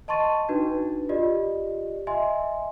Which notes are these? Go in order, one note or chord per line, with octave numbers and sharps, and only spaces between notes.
D#5 A5 C6 C#6 A6 D#7
D4 D#4 F#4 B4
F4 G4 D5 D#5
D#5 E5 G#5 C6